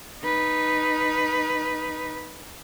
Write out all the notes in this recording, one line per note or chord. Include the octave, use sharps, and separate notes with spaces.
D#4 B4